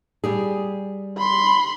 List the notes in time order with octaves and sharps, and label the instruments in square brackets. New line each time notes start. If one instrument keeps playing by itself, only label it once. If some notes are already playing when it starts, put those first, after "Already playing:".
[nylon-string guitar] G3 G4 G#4
[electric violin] B5 C6